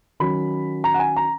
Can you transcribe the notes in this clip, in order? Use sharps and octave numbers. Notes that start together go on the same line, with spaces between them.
D#3 F#3 C#4 B5
A#5
F#5
G#5
A#5